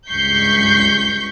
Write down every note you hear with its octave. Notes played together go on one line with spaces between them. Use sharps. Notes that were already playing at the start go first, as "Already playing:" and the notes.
C#2 G2 C#6 G6 B6 C7